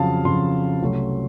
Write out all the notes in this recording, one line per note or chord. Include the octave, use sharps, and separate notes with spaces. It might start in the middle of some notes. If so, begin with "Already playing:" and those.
Already playing: F2 C#3 F#3 F5 A5
F2 C#3 F#3 C6
C2 C3 F#3 A3 C#4